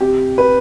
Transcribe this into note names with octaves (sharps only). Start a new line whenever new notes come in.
C3 G4
B4